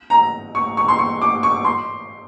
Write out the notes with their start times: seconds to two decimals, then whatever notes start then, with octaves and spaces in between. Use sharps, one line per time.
0.10 A#5
0.55 C#6
0.77 C#6
0.88 C6
0.99 C#6
1.22 D6
1.43 C#6
1.65 C6